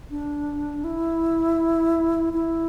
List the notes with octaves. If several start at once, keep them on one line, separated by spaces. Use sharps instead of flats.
D4
E4
E4